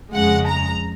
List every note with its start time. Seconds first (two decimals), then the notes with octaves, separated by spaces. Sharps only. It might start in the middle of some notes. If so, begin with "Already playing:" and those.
0.14 F2 C#3 G#3 F#5
0.47 A#5